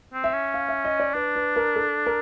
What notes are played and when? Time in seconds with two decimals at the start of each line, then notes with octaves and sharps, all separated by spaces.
0.14 C4
0.24 E5
0.34 C#4
0.54 F5
0.69 E5
0.85 D#5
1.00 D5
1.15 D4 B4
1.36 B4
1.56 A#4
1.76 A4
2.06 A#4